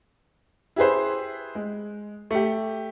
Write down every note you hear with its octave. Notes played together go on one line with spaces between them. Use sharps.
E4 G4 G#4 B4 C5
G#3
A3 G4